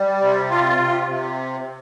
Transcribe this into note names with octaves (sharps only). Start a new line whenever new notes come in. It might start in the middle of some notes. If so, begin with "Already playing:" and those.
Already playing: G3
C3
F4
C3
C3